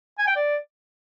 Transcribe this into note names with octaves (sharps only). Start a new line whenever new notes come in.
G#5
G5
D5